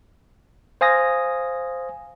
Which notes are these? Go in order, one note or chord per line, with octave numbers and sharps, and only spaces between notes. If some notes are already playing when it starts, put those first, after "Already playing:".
C5 F5 G#5 D#6 A#6